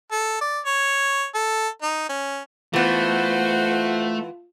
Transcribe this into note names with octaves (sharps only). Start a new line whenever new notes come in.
A4
D5
C#5
A4
D#4
C#4
E3 A3 B3 F4 F#4 C5 F#5